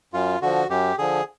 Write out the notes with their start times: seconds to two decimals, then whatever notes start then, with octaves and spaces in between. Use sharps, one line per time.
0.13 F#2 F4
0.42 D3 F3 F#4
0.70 F#2 G4
0.98 D3 F3 G#4